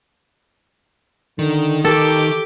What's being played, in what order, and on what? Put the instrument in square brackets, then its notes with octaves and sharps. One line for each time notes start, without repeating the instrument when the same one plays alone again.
[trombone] D3 [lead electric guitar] D#3
[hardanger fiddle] G4 D6 [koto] A4 [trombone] A#4